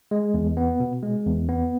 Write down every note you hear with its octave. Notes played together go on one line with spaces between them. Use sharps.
G#3
E2
B3
B2
G#3
E2
B3